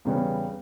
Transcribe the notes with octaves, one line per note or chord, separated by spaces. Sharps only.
E2 C#3 G3 B3